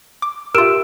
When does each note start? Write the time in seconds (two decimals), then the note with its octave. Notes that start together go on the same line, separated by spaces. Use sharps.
0.22 D6
0.55 F4 G4 A#4 E5 E6 D7 E7